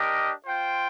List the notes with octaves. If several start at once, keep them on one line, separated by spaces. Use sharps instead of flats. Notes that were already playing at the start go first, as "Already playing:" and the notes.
Already playing: D4 G4 A#4 D#5
F4 C5 G5